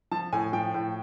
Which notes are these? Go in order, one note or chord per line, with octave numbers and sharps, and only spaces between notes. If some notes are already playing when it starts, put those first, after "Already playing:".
F3 A5
A2 G#5
F3 G5
A2